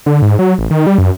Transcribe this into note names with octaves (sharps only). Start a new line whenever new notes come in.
D3
G#2
F#3
A1
D#3
G3
F#2